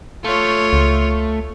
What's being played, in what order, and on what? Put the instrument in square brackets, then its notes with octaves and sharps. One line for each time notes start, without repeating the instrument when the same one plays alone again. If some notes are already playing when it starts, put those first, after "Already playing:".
[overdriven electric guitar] A3 [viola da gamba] F4 C#5
[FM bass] C#2